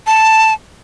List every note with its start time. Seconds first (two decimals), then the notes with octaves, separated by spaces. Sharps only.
0.07 A5